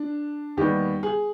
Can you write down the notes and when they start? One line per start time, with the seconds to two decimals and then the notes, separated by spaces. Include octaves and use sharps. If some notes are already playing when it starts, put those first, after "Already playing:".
Already playing: D4
0.57 D#2 D#3 G3 B3 G4
1.03 G#4